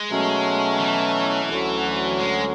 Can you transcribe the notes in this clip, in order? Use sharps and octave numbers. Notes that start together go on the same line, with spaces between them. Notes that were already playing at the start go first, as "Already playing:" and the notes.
Already playing: G#3
B2 F#3 A3 C#4
E3
D2 D3 F#3 C#4
G#3